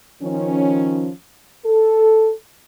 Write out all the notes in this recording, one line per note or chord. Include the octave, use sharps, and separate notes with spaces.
D#3 F3 C#4
A4